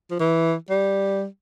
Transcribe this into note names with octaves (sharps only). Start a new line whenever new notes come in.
F3
E3
G3